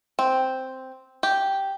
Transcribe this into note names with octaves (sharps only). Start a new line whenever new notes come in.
C4
G4